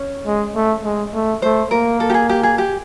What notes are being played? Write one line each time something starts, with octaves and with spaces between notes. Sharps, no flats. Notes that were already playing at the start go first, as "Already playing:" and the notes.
Already playing: C#4 C#5
G#3
A3
G#3
A3
A3 C5
A#3 A#4
A4
G4
G#4
G4
G#4
G4